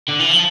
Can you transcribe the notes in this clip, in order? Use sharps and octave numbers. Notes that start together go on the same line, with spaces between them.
D3
E3
F3